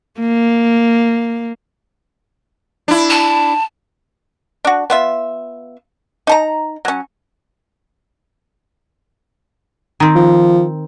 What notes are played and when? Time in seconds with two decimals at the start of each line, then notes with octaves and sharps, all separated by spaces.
0.20 A#3
2.88 D4 E4
3.10 A5
4.65 D4 F#4
4.90 B3 F4 E5
6.27 D#4 A5 A#5
6.85 F#3 C#4
10.00 D#3 C4
10.15 F3